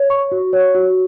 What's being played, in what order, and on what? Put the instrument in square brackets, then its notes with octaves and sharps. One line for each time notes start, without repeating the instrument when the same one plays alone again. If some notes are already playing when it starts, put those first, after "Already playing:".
Already playing: [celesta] C#5
C#6
F#4
C#5
F#4